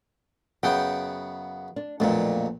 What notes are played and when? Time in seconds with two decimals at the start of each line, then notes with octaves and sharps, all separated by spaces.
0.63 F#2 C#3 B3 G5
1.76 D4
2.00 B1 F2 A#2 A3 A#3 D4